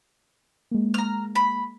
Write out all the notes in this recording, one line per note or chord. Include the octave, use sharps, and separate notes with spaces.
G#3 A#3
A#5 F6
B5